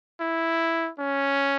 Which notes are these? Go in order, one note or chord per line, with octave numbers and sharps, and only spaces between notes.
E4
C#4